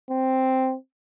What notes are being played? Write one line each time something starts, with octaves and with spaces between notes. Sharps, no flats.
C4